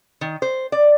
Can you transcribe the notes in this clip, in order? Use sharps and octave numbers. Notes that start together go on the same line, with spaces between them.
D#3
C5
D5